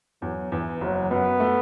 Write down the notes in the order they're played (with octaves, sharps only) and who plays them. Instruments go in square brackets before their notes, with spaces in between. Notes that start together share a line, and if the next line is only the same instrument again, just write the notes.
[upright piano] E2 [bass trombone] F#3
[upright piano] E2 [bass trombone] E3
[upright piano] F#1 [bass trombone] F#3
[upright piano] F#2 [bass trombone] B3
[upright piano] A3